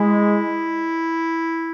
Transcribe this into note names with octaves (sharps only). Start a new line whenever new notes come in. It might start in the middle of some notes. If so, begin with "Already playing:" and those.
Already playing: G#3 E4